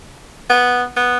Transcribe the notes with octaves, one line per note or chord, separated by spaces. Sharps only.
B3
B3